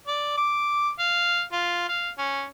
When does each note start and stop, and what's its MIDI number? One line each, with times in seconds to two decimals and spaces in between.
0.07 0.36 74
0.38 0.90 86
0.99 1.41 77
1.52 1.85 65
1.89 2.09 77
2.18 2.45 61